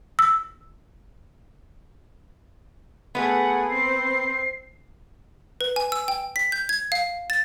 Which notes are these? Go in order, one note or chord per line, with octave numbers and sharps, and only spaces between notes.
E6
A3 B3 G#4 B4 F#5
C4 C5 C7
B4
G#5
E6
G5
B6
G6
G#6
F5
A6